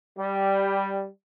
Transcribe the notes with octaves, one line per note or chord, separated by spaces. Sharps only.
G3